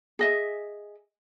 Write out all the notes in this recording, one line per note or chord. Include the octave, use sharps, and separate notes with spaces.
G#4 D#5 E5